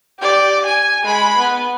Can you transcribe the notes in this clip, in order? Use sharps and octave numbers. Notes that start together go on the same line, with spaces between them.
G4 D5
G#5
G#3 B5
B3